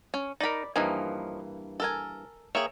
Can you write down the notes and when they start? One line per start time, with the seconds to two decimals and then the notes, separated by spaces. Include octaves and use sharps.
0.14 C#4
0.41 D#4 A#4 D5 B5
0.76 G2 E3 F3 A#3 D#4 G#5
1.80 A4 A#4 G#5
2.55 A#3 G#4 C#5 E5 G5